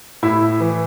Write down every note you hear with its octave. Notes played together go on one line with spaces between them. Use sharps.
A2 E4
E3